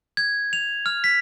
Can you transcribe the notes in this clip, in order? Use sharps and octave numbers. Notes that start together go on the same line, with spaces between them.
G#6
F7
F6
B6